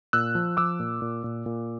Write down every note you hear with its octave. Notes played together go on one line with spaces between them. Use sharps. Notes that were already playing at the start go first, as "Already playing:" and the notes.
A#2 E6 F#6
F3
F3 D6 E6
A#2
A#2
A#2
A#2